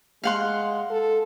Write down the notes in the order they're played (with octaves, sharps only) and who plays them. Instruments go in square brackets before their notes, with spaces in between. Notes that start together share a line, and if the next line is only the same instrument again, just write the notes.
[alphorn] G#3 [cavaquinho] F5 F#5 C6
[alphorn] A4